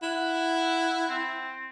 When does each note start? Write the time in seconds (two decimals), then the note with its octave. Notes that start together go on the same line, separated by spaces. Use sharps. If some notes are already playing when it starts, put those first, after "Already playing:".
0.03 E4 F#5
1.08 C4